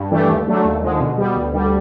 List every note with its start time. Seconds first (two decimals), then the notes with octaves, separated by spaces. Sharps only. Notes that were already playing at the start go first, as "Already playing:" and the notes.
Already playing: G2
0.11 E3 A3 D4 G4
0.29 D#2
0.46 D3 F#3 A3 D4
0.65 D#2
0.82 D3 F3 G#3
1.00 B2
1.18 G3 B3
1.36 D2
1.53 D3 G3